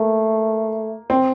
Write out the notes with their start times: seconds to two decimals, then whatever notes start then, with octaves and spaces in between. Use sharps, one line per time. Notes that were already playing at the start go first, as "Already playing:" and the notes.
Already playing: A3 A#3
1.10 C4